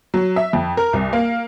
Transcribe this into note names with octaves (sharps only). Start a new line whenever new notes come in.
F#3
E5
F2
A#4
C2
A#3